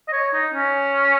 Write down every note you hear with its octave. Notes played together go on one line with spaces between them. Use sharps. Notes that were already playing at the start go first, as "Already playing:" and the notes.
D#5
C#5
D#4
C#4